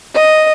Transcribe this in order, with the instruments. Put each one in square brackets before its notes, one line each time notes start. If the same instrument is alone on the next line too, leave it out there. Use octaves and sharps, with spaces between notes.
[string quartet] D#5